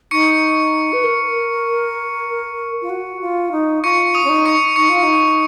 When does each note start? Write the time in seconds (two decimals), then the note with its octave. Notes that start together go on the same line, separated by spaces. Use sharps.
0.11 D#4 C#6 C#7
0.93 B4
1.04 A#4
2.82 F4
2.90 F#4
3.21 F4
3.52 D#4
3.83 F4 C#6 C#7
4.14 D#6 D#7
4.24 C#4
4.29 D#4
4.45 C#6 C#7
4.76 D#4 C#6 C#7
4.89 F4
5.03 D#4